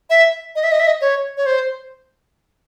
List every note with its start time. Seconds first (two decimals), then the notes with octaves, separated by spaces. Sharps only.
0.10 E5
0.55 D#5
0.64 E5
0.72 D#5
0.80 E5
0.87 D#5
1.01 C#5
1.37 C#5
1.46 C5